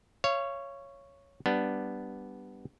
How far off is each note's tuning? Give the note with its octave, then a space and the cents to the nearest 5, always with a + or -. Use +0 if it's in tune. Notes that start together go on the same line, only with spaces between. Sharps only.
C#5 +0 F5 -35
G3 +0 B3 +0 D4 +0